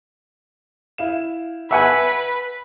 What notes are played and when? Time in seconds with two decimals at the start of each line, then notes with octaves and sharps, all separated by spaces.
0.98 E4 F5 E7
1.71 B4 E5 F#5 G#5